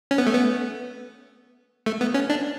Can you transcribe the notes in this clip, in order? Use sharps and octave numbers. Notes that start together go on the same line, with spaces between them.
C#4
B3
A3
B3
A3
B3
C#4
D4